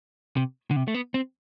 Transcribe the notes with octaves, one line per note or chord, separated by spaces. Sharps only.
C3
D3
C3
A3
B3
C4